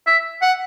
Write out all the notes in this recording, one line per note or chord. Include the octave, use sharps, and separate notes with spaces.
E5
F#5